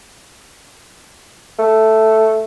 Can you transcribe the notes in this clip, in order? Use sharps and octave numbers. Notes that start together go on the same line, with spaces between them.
A3